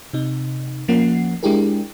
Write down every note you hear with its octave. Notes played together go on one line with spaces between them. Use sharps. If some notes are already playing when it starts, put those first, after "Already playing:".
C3 D#4
F3 A#3 C#4 F#5 C7
G#3 D4 E4 G4 G#4 A#4